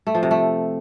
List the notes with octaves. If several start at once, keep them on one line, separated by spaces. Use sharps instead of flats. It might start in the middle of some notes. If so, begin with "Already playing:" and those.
A3
F3
C3
A3